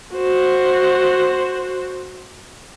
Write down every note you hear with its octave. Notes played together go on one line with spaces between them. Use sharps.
F#4 C5